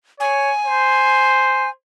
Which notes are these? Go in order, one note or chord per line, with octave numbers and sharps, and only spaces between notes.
C#5 G#5
C5